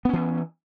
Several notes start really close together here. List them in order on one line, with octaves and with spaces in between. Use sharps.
B3 C#4 E3